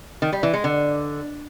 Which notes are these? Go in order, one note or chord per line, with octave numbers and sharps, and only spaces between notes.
D#3
G3
E3
G#3
D3